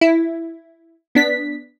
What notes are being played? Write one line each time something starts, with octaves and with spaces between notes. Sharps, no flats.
E4
B3 D4 B6